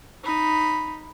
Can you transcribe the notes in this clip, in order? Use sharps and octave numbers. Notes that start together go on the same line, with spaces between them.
D#4 B5